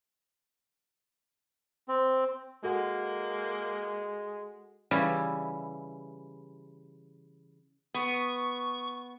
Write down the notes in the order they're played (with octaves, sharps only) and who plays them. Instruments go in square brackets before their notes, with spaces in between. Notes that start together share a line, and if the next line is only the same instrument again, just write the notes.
[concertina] C4
[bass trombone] G#3 [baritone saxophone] A#3 [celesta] F#4 A4 F#5
[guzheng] C#3 E3 G3 C#4 E4
[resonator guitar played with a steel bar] B3 [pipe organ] C#6